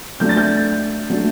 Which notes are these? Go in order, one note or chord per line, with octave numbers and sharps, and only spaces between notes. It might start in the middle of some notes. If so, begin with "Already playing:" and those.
F#3 A3 D4 G6
A6
G6
F#3 A3 D4